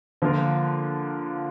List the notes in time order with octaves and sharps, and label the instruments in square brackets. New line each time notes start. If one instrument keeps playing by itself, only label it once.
[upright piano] D3 F3 A#3 F4 A#4